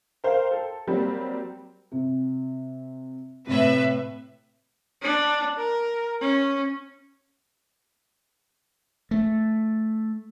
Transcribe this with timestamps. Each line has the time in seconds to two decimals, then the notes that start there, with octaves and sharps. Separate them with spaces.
0.24 A#4 C5 F5 G5
0.51 A4
0.87 F#3 G3 A#3 C4
1.92 C3
3.47 A2 C3 B4 E5
5.02 D4
5.58 A#4
6.21 C#4
9.11 A3